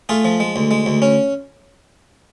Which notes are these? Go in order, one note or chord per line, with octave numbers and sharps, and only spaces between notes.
A3 F4 G#4
F3
G#3
D2
G#3
D2
C#4